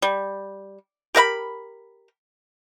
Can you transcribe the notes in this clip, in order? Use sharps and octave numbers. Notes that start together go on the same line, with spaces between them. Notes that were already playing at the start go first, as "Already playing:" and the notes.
G3
G4 A#4 F5 B5